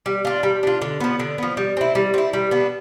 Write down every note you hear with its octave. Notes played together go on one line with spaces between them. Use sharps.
G3
D4 F4
G3
D4 F4
D3
F3 B3
D3
F3 B3
G3
C4 E4
G3
C4 E4
G3
B3 D4